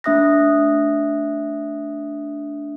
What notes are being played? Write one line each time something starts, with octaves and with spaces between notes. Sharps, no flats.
A3 D4 E5 D#6 F#6 A#6